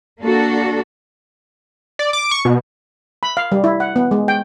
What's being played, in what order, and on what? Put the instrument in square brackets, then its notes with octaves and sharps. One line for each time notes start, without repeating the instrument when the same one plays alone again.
[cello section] A#3 D4 F#4 A4
[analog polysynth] D5
D6
C#6
B2
[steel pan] B5
F5
G3
E4
F#5
B3
G#3
G5